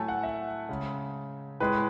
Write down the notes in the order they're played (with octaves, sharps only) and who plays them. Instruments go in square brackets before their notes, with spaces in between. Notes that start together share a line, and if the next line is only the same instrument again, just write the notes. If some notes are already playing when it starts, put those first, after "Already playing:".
Already playing: [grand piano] A2 F#3 A3 G#5 A5
F#5
E5
C#3 G#3
A2 G#3 B4